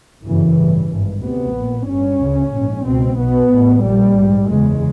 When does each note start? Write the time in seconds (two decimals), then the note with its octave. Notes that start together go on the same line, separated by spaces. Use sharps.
0.24 G1 F#2 C#3 E3
0.57 A1 G2
0.90 G#1 G2
1.22 D2 C3 B3
1.55 A#1 A#2
1.88 G1 G2 C#4
2.21 D2 C#3
2.53 A#1 G#2
2.86 C#2 B2 C4
3.19 B1 B2 B3
3.52 A1 A2
3.84 A#1 A#2 G3
4.17 A#1 G#2
4.49 F#1 E2 C#3 G#3